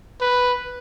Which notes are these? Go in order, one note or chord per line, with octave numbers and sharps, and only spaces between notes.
B4